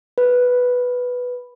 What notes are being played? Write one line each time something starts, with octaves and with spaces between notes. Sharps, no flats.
B4